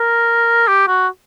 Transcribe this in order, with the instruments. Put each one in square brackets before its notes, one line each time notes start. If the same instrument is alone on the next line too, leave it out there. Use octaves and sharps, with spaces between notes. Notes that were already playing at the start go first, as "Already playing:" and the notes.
Already playing: [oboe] A#4
G4
F#4